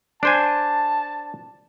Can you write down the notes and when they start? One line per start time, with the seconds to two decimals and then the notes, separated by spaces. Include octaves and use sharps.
0.23 D4 C5 G#5 A5